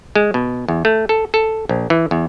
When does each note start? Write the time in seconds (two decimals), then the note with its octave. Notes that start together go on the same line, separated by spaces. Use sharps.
0.15 G#3
0.34 B2
0.68 E2
0.85 A3
1.09 A4
1.34 A4
1.69 A#1
1.90 E3
2.11 E2